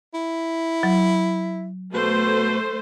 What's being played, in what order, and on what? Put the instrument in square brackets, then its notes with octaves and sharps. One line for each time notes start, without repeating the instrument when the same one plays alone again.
[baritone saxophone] E4
[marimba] F#3
[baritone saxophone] B2 [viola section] A3 C5